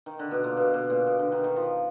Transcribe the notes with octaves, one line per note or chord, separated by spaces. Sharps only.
D#3
D3
B2
A#2
B2
B2
A#2
B2
D3
D#3
D#3
F3